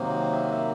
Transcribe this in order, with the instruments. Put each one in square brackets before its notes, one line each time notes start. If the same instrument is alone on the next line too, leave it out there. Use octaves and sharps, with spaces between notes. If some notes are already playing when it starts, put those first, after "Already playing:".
Already playing: [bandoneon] C3 D#3 F#3 A#3 [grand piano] C5
[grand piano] E5
E5